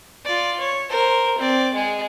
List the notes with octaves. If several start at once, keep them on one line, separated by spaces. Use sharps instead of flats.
F4 D5
C#5
A#4 C5
C4 D5
G#3 G#4